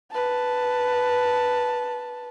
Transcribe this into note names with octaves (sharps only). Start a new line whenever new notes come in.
B4 A5